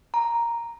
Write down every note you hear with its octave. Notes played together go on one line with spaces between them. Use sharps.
A#5